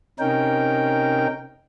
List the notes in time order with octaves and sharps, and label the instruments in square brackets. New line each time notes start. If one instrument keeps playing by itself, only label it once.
[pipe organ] C3 C#4 D#4 A#4 G5